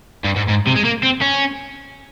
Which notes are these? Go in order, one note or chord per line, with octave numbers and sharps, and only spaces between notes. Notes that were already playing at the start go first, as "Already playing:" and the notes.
G2
G#2
G#2
C3
G#3
A#3
C4
C#4